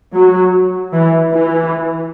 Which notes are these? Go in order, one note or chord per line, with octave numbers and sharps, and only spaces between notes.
F#3
E3
E3